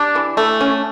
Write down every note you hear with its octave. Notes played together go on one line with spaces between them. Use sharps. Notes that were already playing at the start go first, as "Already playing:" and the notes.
Already playing: D4 G4
E3
A3
C#4